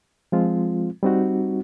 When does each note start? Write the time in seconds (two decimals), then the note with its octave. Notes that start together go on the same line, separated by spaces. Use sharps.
0.32 F3 G#3 C4 F4
1.03 G3 C4 D#4 F#4